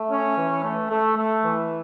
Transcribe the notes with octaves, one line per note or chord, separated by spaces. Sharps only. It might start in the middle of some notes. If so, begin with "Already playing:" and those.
Already playing: A3
C#4
E3
A3
A3
A3
E3